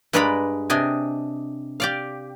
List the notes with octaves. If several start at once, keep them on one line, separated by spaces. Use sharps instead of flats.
G2 G#3 B4 D5 A#5 B5
C3 D4 D#5 G#5
G4 D5 F5